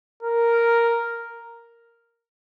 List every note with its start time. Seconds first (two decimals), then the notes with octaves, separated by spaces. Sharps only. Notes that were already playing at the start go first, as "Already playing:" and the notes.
0.23 A#4